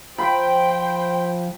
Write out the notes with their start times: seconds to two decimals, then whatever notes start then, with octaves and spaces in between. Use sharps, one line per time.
0.18 F3 C5 G5 B5